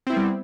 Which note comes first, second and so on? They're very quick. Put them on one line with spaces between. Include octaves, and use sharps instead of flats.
C4 E4 B3 G3